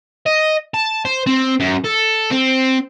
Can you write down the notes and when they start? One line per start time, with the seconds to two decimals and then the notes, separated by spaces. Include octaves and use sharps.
0.26 D#5
0.74 A5
1.05 C5
1.27 C4
1.60 F#2
1.84 A4
2.31 C4